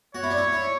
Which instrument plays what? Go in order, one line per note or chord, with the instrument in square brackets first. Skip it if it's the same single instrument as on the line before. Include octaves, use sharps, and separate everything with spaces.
[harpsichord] F#4 [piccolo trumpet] C#5
[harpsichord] E4
D4
E4
E4